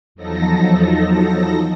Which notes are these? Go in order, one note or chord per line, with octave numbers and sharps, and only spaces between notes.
E2 F3 F#3 D#4 A4 A#6